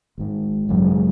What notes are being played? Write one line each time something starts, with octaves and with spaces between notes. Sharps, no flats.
G#1 G#2
G#1 F#2 C#3 F#3
G#3